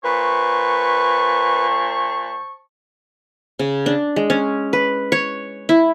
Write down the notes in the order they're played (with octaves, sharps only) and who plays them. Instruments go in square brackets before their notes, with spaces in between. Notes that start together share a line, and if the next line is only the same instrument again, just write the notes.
[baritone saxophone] A#2 [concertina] B4 [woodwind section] C5 A5 C#6
[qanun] C#3
D4
G#3
C#4
B4
C#5
E4